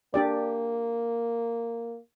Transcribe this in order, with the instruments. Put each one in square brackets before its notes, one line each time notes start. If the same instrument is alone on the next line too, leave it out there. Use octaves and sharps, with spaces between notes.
[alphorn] A#3 [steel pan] D4 G4 D5